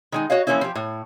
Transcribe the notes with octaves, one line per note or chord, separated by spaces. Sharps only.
D#3 G#3 D#4
F#4 C#5 D#5 F5
E3 F3 A#3 C#4 E4
F3 G4
A2